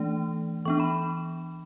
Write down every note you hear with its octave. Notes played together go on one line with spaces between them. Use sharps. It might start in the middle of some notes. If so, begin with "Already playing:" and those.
Already playing: E3 A3 D4
E3 B3 D4 C#6
B5